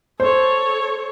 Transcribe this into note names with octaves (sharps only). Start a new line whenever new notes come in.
A4 C5 C#5